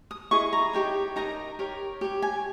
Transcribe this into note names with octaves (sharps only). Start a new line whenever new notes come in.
D#6
E4 G#4 D#5 C#6
A#5
D#4 G4 C#5 G5
D#4 A#4 D#5 A#5
G4 A#4 C#5
G4 C#5
G#5